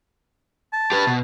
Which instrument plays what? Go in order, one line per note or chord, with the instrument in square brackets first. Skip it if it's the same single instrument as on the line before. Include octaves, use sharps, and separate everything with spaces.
[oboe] A5
[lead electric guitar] G4 B4
B2